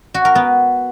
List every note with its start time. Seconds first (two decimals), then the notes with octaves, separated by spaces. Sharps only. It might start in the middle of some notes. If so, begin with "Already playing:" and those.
0.14 F#4
0.25 A#4
0.35 B3